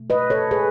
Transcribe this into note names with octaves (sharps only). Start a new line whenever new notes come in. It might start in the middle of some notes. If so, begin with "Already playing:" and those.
Already playing: B2 A3
B4 D#5
A4 C#5
G#4 B4